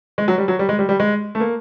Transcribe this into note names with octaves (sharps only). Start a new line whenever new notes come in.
G#3
F#3
G3
F#3
G3
G#3
G3
G3
G#3
A3
A#3